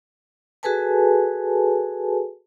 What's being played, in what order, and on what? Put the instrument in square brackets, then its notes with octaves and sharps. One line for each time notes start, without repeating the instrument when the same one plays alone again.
[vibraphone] F#4 G#4 A4 B4 G#5 A5